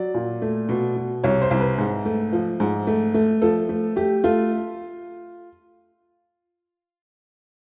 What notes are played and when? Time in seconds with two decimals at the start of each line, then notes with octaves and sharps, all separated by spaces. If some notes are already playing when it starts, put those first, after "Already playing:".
Already playing: F#3 D5
0.14 A#2
0.42 A3
0.69 B2
0.96 B2
1.24 C2 C#5
1.42 C5
1.51 C2
1.60 B4
1.78 G#2
2.05 A3
2.32 F3
2.60 G#2
2.87 A3
3.14 A3
3.42 F3 A4
3.69 A3
3.96 A3 G4
4.24 A3 F4